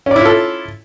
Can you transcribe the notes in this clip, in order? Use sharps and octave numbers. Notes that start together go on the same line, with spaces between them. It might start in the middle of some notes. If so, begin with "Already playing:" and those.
C#4 E4 F4 A4 D5